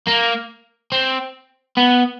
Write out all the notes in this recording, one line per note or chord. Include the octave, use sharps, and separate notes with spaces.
A#3
C4
B3